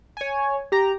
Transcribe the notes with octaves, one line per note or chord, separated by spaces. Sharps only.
C#5 G#5
G4 A#5